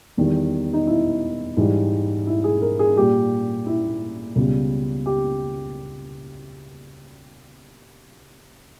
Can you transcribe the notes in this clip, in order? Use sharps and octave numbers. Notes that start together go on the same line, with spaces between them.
E2 D#3 G3
D#4
E4
G#2 E3 G3
E4
G#4
A#4
G#4
A#2 G3 G4
E4
C#2 B2 G3
G4